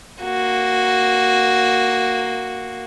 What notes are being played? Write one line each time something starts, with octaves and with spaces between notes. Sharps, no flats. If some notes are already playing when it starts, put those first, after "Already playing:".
A#3 F#4